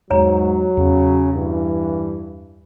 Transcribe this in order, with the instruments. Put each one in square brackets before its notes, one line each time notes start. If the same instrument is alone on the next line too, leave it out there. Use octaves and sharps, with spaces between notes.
[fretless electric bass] E2 G#3 [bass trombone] G#2 [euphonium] F#3 [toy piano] C#5 A#5
[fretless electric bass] E2 [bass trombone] C#3
[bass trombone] G2 [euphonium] E3